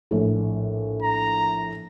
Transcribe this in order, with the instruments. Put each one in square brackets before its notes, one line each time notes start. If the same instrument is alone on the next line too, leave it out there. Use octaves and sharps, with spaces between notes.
[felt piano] A#1 A2
[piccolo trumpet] A#5